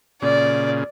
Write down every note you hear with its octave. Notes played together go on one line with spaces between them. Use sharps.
A#2 C#3 D5